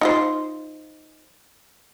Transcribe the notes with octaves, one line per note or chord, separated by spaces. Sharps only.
D#4 F4 C5